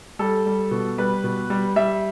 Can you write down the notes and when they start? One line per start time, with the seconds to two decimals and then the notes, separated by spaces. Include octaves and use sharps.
0.19 G3 A4
0.46 G3
0.71 B2
0.98 G3 B4
1.24 B2
1.50 G3
1.76 G3 E5